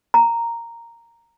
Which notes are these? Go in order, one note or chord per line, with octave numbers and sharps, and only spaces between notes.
A#5